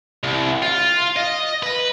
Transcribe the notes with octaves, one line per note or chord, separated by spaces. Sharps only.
C2
F4
D#5
B4